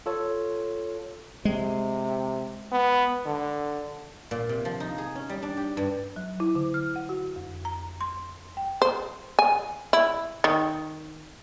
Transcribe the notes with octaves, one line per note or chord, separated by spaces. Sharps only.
F4 A4 C#5
C3 G#3
B3
D3
A#2
C3
F3
D#4
G#4
C#4
G3
D4
G4
G2
F#3
E4
D3
F6
F#5
F#4
F2
A#5
C6
G5
C5
G#5
E4
D#3